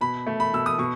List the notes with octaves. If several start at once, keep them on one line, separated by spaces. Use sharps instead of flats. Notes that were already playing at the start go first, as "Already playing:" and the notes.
B2 B5
A3
B5
B2 E6
D#6
B2 C#6